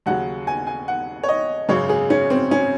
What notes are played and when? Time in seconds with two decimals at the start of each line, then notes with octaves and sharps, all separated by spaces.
0.06 D#2 C#3 F#3 F#5
0.47 G#5
0.67 G#5
0.88 F#5
1.23 C#5
1.29 D#5
1.69 G#1 F#2 C#3 C#5
1.89 G#4
2.10 C#4
2.30 C4
2.51 C#4